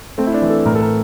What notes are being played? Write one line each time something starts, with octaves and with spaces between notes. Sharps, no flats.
A3 C4
E4
D4
E3
A4
A2 A#4
A4
A#4